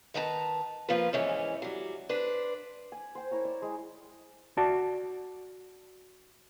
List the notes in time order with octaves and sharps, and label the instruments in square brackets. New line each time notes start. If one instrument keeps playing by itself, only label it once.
[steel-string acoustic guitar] D#3 B4 A5 A#5
F3 A#3 F4 B4
G#2 E3 C#4
F#3 G3
D4 B4 C5
[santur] G#5
C5 G5
E4 A#4 C#5
D5 E5
G#3
[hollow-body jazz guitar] F#4 D5 A5